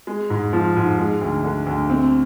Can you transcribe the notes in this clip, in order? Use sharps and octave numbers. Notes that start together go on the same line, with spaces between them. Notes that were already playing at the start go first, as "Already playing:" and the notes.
G#3
G#2
F3
G#2
G#3
D2
D3
D2
C4